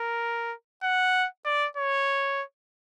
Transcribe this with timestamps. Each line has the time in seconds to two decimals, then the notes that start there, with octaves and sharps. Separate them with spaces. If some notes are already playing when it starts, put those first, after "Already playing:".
Already playing: A#4
0.83 F#5
1.46 D5
1.77 C#5